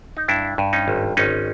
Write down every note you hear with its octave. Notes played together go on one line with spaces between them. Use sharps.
D#4
G2 D4 E4
G2
C#4 D#4
G#1
G#1 C#4 D#4